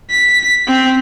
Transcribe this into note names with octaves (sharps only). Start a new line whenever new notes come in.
B6
C4